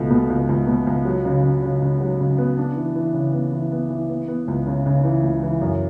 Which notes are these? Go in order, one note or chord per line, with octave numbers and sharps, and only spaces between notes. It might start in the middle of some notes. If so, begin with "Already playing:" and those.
Already playing: C#2 B2 A3
B2
C#2
C#2
B2
C#2
F#3
C#3
C#3
C#3
C#3
F#3
C#3
B3
D4
E3
E3
C#3
B3
E3
B3
E3
B3
B3
C#2
C#3
C#3
E3
C#2
E3
F#2